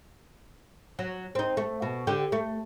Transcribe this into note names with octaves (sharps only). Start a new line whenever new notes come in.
F#3
C4 D#4
A3
B2
D3 G4
A3